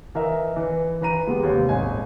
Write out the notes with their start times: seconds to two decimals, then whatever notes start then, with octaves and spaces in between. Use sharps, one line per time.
0.15 E3 A#4 D#5 E5
0.56 E3 B4
1.01 E3 B4 A#5 D#7
1.27 G#3 B3 G4
1.43 D#2 C3
1.69 D#1 G#1 D#5 G#5